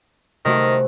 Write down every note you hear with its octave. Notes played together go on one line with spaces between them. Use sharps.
C3 D#3 A3 F#4